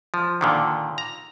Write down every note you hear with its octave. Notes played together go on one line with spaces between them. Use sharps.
F3
A#2 D3 D#3
A#5